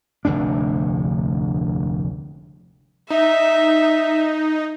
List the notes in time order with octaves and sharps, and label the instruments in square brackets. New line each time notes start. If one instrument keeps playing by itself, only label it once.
[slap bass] F1 D2 A2 D4
[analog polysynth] D#4 [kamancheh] E5